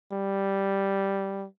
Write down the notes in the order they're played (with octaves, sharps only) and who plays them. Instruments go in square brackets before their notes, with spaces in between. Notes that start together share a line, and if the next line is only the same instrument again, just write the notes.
[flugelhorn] G3